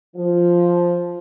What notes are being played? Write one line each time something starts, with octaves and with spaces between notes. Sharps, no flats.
F3